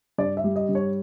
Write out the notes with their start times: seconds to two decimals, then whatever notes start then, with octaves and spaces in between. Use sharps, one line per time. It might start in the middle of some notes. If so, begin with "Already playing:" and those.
0.18 G2 D5
0.37 E5
0.44 G3
0.56 D#5
0.69 G2
0.75 C#5